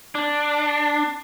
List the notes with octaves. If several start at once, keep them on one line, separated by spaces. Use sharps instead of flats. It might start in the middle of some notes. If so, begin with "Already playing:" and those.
D4